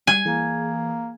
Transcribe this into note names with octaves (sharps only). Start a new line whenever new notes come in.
G3 G#5
E3 A#3 G#4